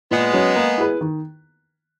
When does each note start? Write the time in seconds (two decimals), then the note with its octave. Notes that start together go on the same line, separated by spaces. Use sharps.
0.11 A#2 G#3 B3
0.33 F#3 C#4
0.56 A#3
0.78 E4 G#4 B4
1.01 D#3